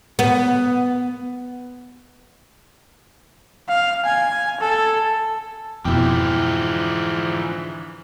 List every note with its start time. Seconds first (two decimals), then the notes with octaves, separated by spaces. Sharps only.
0.19 B3
3.69 F5
4.05 G#5
4.61 A4
5.85 F2 G#2 B2 D3 E3 F3 E4 G5